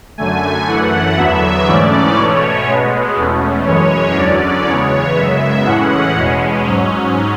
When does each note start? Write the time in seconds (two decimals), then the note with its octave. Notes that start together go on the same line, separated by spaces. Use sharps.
0.18 F#2 D3 A3 G#5
0.67 F#2 E3 A3 F#5
1.17 E2 D3 F#3 B3 E5
1.67 G#2 E3 A3 C#4 D5
2.17 B2 A3 C#4 C#5
2.67 B2 G#3 B3
3.16 E2 B2 A3 C#4
3.66 F#2 E3 G#3 C#4 C#5
4.16 E2 D3 F#3 C#4 D5
4.66 E2 C#3 G#3 B3 C#5
5.16 F#2 C#3 G#3 B3 E5
5.66 A2 E3 G#3 C#4 F#5
6.16 E2 B2 G#3 C#4
6.66 G#2 F#3 C#4